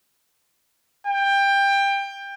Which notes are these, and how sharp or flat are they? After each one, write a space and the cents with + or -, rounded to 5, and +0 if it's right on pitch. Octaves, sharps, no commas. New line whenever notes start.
G5 +20